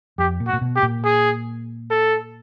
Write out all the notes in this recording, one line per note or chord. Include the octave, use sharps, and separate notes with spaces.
F2 G4
A#2
F#4
A#2
B2
G4
A#2
G#4
A4